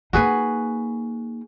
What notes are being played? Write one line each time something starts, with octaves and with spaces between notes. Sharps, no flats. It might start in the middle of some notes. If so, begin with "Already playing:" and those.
A#3 D#4 F#4 G#4 B4